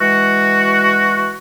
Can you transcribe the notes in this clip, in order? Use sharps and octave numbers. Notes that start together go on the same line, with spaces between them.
E3 G#3 F#4